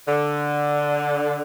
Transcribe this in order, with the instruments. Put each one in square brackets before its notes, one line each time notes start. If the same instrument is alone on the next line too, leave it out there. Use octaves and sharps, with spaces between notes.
[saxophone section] D3